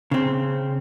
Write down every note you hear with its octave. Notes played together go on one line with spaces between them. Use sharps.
C#3 C4